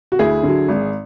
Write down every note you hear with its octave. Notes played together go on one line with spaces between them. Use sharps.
F#4
D2 E4 G#4
D3 F#3
G#1